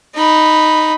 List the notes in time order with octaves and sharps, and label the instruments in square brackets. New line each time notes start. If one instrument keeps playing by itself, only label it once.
[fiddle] D#4 B5